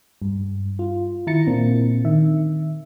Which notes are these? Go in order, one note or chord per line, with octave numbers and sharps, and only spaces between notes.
G2
F4
D#3 E4 A#5 A6 C#7
A#2 A#3 C4 D4
D#3 E5